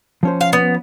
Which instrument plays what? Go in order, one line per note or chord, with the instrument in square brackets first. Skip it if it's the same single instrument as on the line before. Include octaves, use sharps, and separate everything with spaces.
[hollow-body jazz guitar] F3 C#4 C5
[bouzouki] F5
B3